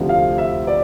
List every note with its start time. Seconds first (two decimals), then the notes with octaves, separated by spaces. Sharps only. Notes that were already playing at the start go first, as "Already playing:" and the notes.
Already playing: D2 C3 F3 A3 C4
0.09 F5
0.38 E5
0.67 D5